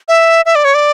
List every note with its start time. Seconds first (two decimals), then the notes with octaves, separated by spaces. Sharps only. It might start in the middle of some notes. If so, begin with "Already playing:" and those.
0.08 E5
0.46 E5
0.55 D5
0.65 C#5
0.74 D5